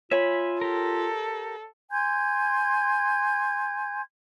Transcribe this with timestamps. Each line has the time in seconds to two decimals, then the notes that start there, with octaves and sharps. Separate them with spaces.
0.11 F4 C#5 E5 G#5 B5
0.61 G4 A4 A#4
1.91 G#5 C6 G6 G#6